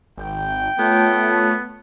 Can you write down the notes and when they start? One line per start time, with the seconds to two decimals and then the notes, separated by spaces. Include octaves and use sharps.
0.17 G#1 G5
0.79 A3 B3 F4 C#5 A5